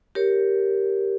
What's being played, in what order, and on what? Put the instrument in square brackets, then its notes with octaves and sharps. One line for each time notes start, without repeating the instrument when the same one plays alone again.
[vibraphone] G4 A#4 C#5